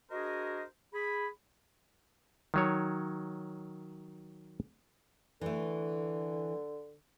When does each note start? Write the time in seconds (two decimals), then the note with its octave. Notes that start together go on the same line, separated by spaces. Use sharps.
0.11 D4 F#4 G#4 A#4 C5 D#5
0.93 G#4 B5
2.54 D#3 F#3 C#5
5.41 D3 E3 A3